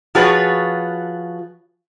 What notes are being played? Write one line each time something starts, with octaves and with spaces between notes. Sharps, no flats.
F3 F4 F#4 G#4 B4 C#5